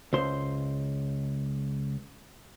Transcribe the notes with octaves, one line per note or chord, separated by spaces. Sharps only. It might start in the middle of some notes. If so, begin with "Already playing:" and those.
C#2 C5